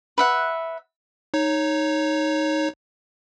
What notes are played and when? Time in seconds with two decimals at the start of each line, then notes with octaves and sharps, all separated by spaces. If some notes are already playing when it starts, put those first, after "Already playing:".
0.18 B4 E5 F#5
1.34 D#4 C#5